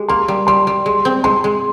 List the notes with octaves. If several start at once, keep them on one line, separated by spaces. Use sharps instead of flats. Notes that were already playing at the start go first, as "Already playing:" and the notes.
Already playing: G#3 G4
A#3 C6
G3
G3 C6
G3
G#3
C4
G#3 C6
G#3